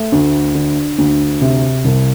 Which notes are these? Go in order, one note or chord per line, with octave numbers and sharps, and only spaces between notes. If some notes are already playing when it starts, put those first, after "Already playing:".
Already playing: A3
D2
D3
D2
C3
C2